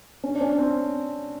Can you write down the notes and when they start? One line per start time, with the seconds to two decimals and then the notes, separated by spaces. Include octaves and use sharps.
0.24 C#4
0.35 D4
0.41 C#4
0.59 C4